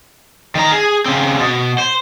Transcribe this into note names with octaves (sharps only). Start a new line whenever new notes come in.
D#3 A#5
G#4
C#3 C4
B2
C5